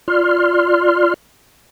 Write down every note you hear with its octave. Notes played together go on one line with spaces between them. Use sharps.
F4 D5 C6 F6